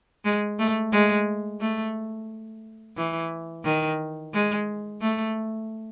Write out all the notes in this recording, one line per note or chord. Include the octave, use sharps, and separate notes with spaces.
G#3
A3
G#3
A3
E3
D#3
G#3
A3